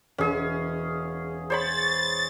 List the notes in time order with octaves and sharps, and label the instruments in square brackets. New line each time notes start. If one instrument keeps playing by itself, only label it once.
[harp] E1 [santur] C#4 G#4
[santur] C5 C#5 B5 [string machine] A6